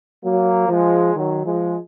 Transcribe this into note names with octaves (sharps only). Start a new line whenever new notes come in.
F#3 A#3
F3 G#3
D#3 F#3
F3 G#3